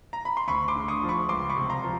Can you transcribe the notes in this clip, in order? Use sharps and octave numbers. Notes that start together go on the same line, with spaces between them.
A#5
B5
C6
D2 B5 C#6
C6 D6
D3
C#6 D#6
F3
B5 C#6
C#2 C6 D6
B5 C#6
C3
A#5 C6
F3